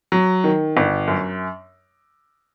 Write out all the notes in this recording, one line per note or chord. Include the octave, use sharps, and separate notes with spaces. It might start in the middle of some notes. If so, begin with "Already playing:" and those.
F#3
D#3
G1
F#2